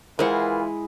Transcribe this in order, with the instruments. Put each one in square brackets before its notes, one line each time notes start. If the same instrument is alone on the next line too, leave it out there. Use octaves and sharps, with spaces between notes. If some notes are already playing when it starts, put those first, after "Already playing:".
[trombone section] E3 F4 [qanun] G#3 E4 [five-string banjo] A#4 C5 F#5